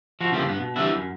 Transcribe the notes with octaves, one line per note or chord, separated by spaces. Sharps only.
F3 F#4
C#3 E3 F3 G3 A#3 D4
G2 B3
B2
E3 F#3 G3 B3 D4 E4
F#2